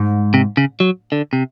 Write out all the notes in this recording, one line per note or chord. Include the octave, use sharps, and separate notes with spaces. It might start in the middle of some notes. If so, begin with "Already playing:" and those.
Already playing: G#2
C3
C#3
F#3
D3
C3